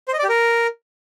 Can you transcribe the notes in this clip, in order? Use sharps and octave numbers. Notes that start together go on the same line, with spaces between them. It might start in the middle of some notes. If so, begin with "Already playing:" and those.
C5
D#5
D5
G4
A#4